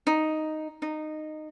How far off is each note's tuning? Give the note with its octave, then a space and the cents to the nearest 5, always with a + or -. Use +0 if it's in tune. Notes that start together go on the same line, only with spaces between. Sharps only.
D#4 +0
D#4 -15